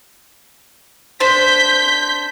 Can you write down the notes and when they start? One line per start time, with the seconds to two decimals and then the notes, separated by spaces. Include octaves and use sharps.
1.20 D4 C5 G6 B6